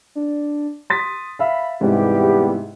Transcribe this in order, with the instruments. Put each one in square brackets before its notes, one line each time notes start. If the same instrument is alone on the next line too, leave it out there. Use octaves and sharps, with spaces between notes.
[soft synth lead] D4
[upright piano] C6 A6 B6 [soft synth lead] D#6
[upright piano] E5 F5 [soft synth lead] B5
[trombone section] E2 G3 B3 [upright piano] G#2 C3 [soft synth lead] E4 [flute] G4